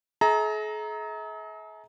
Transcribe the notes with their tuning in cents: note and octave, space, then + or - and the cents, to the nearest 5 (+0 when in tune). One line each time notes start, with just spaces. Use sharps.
G#4 +45 E5 -40 A#5 +0